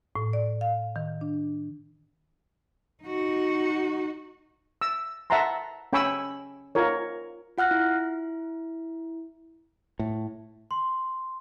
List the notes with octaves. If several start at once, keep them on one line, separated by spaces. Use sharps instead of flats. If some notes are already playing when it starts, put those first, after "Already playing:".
A2
D5
F5
D#3
D4
D#4 F#4
E6
E5 F#5 A5 A#5 C6
C#4 G5 G#5 B5 C#6 E6
F4 A#4 C#5
F4 F#5 F6 F#6 A#6
E4
A2
C6